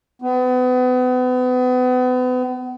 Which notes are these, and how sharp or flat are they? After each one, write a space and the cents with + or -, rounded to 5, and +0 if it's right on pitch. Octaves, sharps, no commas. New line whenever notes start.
B3 +35